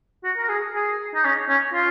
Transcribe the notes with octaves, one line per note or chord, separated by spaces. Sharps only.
F#4
A#4
G#4
G#4
D#4
C#4
C#4
F4